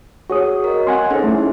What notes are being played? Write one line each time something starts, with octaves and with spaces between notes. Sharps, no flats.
F#4 G#4 C#5 C#6 D#6
A#4 D#5
C4 F#5 G#5 C6
C#4 D#4 G#4 A4 C5
A3 E4